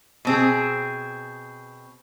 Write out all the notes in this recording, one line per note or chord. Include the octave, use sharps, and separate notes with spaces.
B2 C4 G#4